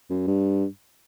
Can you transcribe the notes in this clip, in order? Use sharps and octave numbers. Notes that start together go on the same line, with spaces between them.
F#2
G2